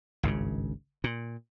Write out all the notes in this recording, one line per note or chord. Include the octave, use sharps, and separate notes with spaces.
G#1 C#2 G2 C#3
A#2